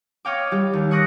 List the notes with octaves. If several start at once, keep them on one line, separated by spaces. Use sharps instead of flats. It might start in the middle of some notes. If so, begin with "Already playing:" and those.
C#5 D#5 F5 G5 C#6 D6
G3 G4
D#2
C#6 D#6 F#6 A#6 C7 D7